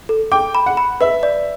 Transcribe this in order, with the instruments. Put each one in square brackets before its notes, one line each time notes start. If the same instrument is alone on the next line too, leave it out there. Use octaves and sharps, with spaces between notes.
[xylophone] A4
[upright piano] G5 [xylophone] D6
[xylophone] B5
[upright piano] F#5
[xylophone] B5
[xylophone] B4 [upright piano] E5
[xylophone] D5